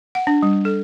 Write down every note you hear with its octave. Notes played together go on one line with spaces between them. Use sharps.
F#5
D4
G3
A4